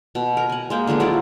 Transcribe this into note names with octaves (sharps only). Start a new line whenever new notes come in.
B2
A#4
F#5 G#5
G#3 A#3 G5
D3 F3 G#3 B3
F#3 E4 F4 D5